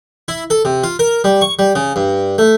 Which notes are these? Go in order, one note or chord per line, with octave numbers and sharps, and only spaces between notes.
E4
A4
C3
F4
A#4
G3
C#6
G3
C#3
G2
A3